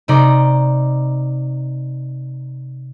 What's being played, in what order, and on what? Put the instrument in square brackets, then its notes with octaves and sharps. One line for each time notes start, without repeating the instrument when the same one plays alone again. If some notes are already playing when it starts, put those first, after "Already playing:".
[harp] C3 D#4 D5 A#5